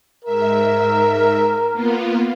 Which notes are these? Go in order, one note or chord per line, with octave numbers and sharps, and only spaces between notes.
G#2 A#4 E5
A#3 B3 F4